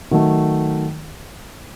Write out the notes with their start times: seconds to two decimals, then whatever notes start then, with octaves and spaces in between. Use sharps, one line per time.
0.11 D#3 F#3 A3